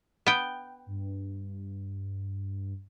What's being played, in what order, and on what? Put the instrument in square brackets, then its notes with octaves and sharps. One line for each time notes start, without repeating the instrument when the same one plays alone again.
[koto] B3 G5
[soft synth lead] G2